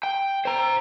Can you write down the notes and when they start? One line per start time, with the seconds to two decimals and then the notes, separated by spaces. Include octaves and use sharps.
0.03 G5
0.45 C5 A#5